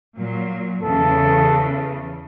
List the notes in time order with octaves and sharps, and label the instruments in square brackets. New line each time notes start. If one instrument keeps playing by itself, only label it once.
[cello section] A#2 F#3
[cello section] E2 C#3 E3 [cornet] A4